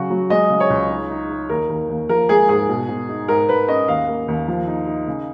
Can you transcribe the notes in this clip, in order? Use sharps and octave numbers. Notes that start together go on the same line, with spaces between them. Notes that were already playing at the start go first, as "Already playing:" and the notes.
Already playing: C#3 F#3 F#4
F#3
G#3 D#5
C#3
C#5
C#2
D#4
D#4
D#4
D#2 A#4
D#2
D#2
F3 A#4
G#3 G#4
G#2 G#4
B2
B2
D#4
G#2 A#4
G#2 B4
C#4 D#5
D#2 F5
A#3
D#2
F3
D#4
D#4
C#3